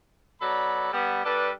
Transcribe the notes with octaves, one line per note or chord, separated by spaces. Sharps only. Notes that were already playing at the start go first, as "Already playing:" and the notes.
B2 F#3 A4 D5 B5
G3 B3
G3 D4 A4 B4 D5